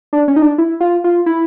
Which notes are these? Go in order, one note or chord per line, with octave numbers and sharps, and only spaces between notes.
D4
C#4
D#4
D4
E4
F4
F4
E4